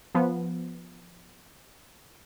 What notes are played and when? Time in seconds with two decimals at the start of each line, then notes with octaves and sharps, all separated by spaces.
0.15 F3 B3